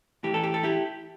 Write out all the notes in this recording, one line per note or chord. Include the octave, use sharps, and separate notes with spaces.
A2 E3 G4
A4
G4
A4
E4 G4